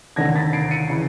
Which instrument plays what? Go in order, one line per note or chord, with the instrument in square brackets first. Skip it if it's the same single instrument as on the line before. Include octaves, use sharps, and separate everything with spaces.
[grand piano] F1 D#2 D3 G#6 A#6
A6 B6
C7 D7
C#7 D#7
C#3 E3